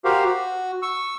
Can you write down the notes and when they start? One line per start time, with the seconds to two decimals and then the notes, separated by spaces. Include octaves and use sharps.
0.05 F#4 G4 A#4 C5 F5
0.25 F#4
0.82 C#6 E6